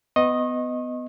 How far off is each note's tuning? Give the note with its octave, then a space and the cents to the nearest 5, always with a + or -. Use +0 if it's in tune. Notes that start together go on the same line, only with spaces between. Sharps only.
B3 +20 D#5 +0 C#6 -40